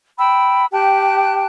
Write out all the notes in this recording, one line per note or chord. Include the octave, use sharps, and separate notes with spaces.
G5 B5 E6
G4 G5 A5 F#6